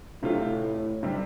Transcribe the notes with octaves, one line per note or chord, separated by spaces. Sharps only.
A2 C3 A3 F4
C3 G3